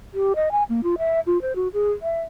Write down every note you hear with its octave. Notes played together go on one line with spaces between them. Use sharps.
G4
D#5
G#5
A#3
F4
E5
F4
C5
F#4
G#4
E5